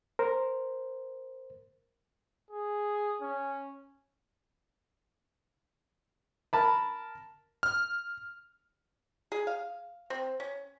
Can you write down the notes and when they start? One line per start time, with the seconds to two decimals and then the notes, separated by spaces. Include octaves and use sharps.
0.19 A#4 C5
2.51 G#4
3.22 C#4
6.53 A#4 A5 B5
7.63 F6
9.32 G#4
9.47 F5
10.10 C4
10.40 C#4